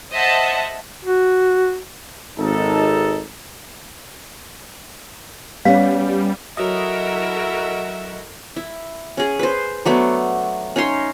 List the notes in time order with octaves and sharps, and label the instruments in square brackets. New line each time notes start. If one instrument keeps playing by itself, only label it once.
[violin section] C5 D#5 E5 F#5 A5
[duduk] F#4
[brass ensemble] G#1 D#4 A4
[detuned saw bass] G3 [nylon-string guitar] B3 C#4 [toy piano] F5
[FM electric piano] F#3 D#5 [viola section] E4 A4 A#4 [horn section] F#4 E5
[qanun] E4
C#4 G#4
B4 C5
F#3 A3 B3 D4
C#4 D#4 C#5 C6